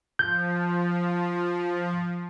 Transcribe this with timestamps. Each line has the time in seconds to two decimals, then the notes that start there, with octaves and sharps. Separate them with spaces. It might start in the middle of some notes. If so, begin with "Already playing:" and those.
0.19 F3 G6